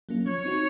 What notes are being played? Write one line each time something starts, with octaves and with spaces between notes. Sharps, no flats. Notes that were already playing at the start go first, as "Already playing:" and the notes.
F#3 A#3 C#4 F4
F3 C#5
C4 D#4 F#4